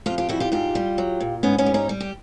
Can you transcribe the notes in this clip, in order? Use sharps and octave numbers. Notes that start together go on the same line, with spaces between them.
F2 F4 G4
F4 G4
G3 E4 F#4
F4 G4
G#2 F4 G4
G3
F#3
A#2
G#2 B3 C#4
B3 C#4
G3
C#4 D#4
G3
G4